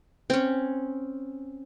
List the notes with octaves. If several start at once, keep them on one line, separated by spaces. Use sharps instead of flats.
C4 C#4